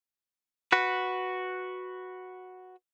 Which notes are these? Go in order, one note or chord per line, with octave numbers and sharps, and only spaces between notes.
F#4 B4